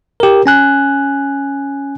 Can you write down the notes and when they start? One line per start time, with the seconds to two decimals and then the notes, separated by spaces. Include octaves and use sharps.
0.20 G4 A#4
0.46 C#4 G#5 F#6